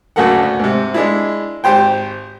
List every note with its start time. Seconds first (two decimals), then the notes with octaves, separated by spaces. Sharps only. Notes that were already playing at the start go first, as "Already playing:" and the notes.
0.16 D2 C#3 F#3 A#3 A4 F#5
0.43 D2
0.59 G#2 C3
0.94 G#3 D4 E4
1.64 G#1 G4 C5 G5